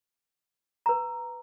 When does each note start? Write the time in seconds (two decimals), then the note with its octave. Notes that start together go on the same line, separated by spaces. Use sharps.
0.86 B4 A#5